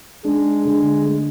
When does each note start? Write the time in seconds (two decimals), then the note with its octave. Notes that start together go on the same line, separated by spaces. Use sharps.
0.25 G#3 D4
0.65 D3 G#3
1.06 A3